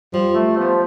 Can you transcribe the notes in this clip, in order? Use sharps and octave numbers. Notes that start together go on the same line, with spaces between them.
F3 G3
A3 F4
F3 B3 C5